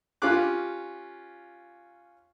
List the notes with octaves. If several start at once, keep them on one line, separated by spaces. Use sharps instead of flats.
C#4 F4 G4 F5 D6 F#6